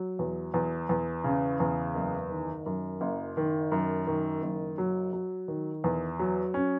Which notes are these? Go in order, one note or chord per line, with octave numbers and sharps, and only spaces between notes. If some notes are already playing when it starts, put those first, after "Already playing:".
Already playing: F#3
E2
E2
E2
C#3
E2
F#1
D#3
F#2
F#1
D#3
F#2
D#3
F#1
F#3
F#3
D#3
E2
F#3
C#4